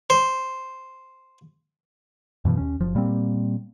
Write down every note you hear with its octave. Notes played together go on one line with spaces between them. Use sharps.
C5
F#2 B2 E3 F3
D#2 C#4
F#1 F3
A#2 G3 A#3 C4